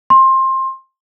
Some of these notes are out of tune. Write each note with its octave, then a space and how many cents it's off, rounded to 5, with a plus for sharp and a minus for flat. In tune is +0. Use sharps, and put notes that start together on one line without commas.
C6 +20